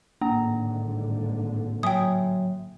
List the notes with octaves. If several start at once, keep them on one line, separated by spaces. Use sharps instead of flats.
G#1 A2 D3 A#3 A#5
F#3 E5 G5 G#5 D#6